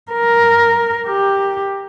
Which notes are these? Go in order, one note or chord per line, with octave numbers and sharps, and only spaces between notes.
A#4
G4